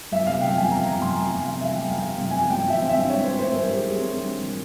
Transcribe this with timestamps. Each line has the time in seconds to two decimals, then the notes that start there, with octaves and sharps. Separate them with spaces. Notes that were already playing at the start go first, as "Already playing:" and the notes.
0.11 G1 E5
0.26 C3 F5
0.41 G1 G5
0.57 F2 G#5
0.71 G1 A#5
0.86 C3 A#5
1.01 G1 C6
1.16 F2
1.31 G1 G#5
1.46 C3 F5
1.61 G1 E5
1.75 F2 G5
1.90 G1 F5
2.05 C3
2.21 G1
2.31 F2 G#5
2.49 G#1 G5
2.65 F3 E5
2.80 C4
2.89 E5
2.95 G2
3.10 G#1 C#5
3.24 F3 C5
3.39 C4 C5
3.54 G2 A#4
3.69 G#1 G4
3.77 G#4
3.84 F3 G4
3.98 C4
4.13 G2
4.28 G#1
4.44 F3